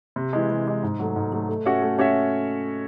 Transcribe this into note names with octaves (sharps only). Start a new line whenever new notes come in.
C3
E3 G#3
C3
E3 G#3
G#2
F#3 A3
G#2
F#3 A3
A3
C#4 F#4 C#5 E5
A3
C#4 F#4 C#5 E5